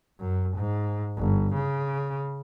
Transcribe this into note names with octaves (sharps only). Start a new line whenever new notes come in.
F#2
G#2
G1
C#3